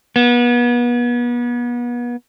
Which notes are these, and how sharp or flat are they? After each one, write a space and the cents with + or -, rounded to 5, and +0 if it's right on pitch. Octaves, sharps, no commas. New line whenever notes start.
B3 -35